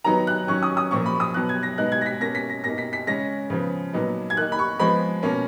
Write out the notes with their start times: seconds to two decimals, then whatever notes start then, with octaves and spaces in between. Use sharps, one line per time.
0.04 D#3 F#3 B3 D#4 A#5
0.27 F#6
0.48 D#3 F#3 C#4 C#6
0.63 D#6
0.77 D#6
0.91 A#2 F3 A#3 C#6
1.06 B5
1.20 D#6
1.34 B2 F#3 B3 F#6
1.49 G#6
1.63 A#6
1.78 B2 G#3 B3 D#4 F#6
1.92 G#6
2.01 A#6
2.06 B6
2.20 B2 A#3 C#4 A#6
2.35 B6
2.49 A#6
2.64 B2 A#3 D#4 A#6
2.78 B6
2.93 B6
3.07 C#3 G#3 C#4 A#6
3.50 C#3 F3 B3
3.93 A#2 F#3 B3 D#4
4.30 G#6
4.37 D#3 A#3 D#4 F#6
4.52 B5
4.59 C#6
4.79 F3 G#3 B3 B5
5.23 B2 A#3 C#4